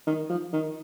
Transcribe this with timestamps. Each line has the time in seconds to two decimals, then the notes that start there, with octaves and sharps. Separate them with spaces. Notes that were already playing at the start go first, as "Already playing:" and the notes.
0.07 D#3
0.29 F3
0.53 D#3